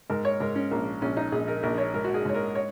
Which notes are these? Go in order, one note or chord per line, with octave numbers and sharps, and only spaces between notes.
G#2 A#4
C#5
G#2 A#4
C#4
A#1 A#3
A#1 C#4
D#4
A#1 G#4
A#4
A#1 A#4
C#5
G#2 A#4
F#4
G#4
G#2 C#5
A#4
C#5